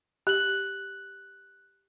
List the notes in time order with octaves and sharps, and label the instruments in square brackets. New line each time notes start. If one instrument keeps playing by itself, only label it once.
[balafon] G4 [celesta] F#6 F#7